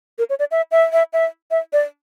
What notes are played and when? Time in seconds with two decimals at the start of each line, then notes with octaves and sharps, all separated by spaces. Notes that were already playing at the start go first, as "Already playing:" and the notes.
0.18 A#4
0.30 C#5
0.39 D5
0.51 E5
0.71 E5
0.93 E5
1.13 E5
1.51 E5
1.73 D5